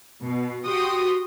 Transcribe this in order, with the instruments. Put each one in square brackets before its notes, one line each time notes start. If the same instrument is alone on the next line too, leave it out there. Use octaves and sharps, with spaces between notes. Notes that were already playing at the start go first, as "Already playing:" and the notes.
[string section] B2
F#4 G4 G5 C6 D#6